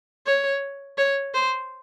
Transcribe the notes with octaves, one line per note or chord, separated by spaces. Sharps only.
C#5
C#5
C5